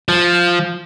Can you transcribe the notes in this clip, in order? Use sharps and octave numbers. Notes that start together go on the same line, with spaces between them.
F3